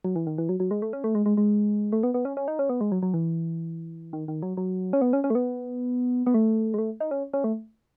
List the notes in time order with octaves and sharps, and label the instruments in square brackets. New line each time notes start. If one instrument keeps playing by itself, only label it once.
[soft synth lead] F#3
E3
D#3
E3
F#3
F#3
G#3
A3
C#4
A3
G#3
G#3
G#3
A3
B3
B3
C#4
C#4
D#4
C#4
B3
G#3
F#3
F#3
E3
D#3
D#3
F#3
F#3
C#4
B3
C#4
C#4
A3
B3
B3
A3
G#3
A3
D#4
C#4
C#4
A3